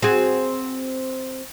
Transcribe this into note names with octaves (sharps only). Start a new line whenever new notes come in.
C4 F#4 G#4